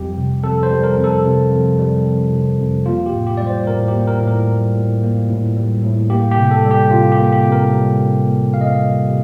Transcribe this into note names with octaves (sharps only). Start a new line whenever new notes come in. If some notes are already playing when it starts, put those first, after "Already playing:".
Already playing: F2 G3 G4
C3
F2 A4
C5
G3
A#4
F2
A4
C3
F2
G3
F2
C3
F2
A#3 F4
G4
A2
G4
G3 D5
C5
A2 A#4
G4
A#3
A#4
A2
A#4
G3
A2
A#3
A2
G3
A2
A#3 G4
G4
C3
A4
G3
G4
C3 F4
G4
A#3
G4
C3
A#4
G3
C3
A#3
C3 F5
D#5
F5
G3
C3